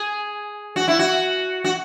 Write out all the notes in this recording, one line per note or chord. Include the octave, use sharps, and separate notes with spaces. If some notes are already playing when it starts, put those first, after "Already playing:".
Already playing: G#4
F#4
E4
F#4
F#4